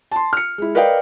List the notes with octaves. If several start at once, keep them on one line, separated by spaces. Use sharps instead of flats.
A5 C6
F6 C#7
G#3 E4
A#4 B4 D5 D#5 F5 G5